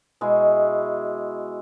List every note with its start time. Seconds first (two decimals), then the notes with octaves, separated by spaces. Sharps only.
0.21 B2 G#3 E4